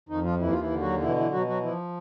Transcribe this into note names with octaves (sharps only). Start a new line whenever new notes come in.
F2 D#3 D#4
F3 F4
D#2 E3 E4
F4
E3 E4
D3
F#3 F#4
B2 E3 E4
E3 E4
B2 F#3 F#4
F#3 F#4
E3 F3 E4